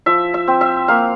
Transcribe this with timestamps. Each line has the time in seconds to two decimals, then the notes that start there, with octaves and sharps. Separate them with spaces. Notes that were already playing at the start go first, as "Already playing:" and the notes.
0.06 F3 E5
0.34 E5
0.47 C4
0.61 E5
0.88 A#3 F5